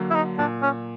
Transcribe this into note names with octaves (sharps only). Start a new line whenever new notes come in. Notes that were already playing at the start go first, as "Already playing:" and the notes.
Already playing: D3 F#3 A#3
E4
D#4
A#2 D4
C#4